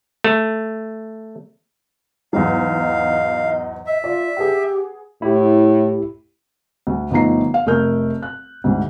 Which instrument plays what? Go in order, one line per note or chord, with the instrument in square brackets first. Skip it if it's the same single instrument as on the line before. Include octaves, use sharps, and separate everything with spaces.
[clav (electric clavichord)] A3
[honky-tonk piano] E2 G#2 F#3 [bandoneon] F5
[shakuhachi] D#5
[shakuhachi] D#5 [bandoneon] E5
[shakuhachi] F4 [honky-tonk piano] D5
[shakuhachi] G4 [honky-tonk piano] G#4 B4 F#5
[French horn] A2 [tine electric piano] E4 G4
[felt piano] D2
G1 F3 A3 D#4 A#5 C7
F5
F1 A3 A4 A#4 F6 G6
F#6
D2 G#2 D3